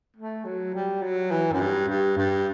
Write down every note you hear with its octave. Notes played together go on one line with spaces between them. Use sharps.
A3
F#3
G3
F#3
E3
F#2
G2
G2
G2